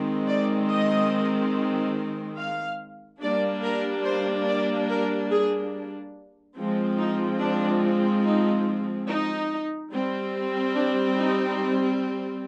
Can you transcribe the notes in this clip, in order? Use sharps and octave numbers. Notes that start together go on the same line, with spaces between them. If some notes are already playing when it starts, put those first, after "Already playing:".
Already playing: D#3 G#3 C4
D5
D#5
F5
G3 A#3 D4 D5
A#4
C5
D5
A#4
G#4
F3 G#3 C4
D#4
D4
D#4
D#4
G3 C4
D4
D#4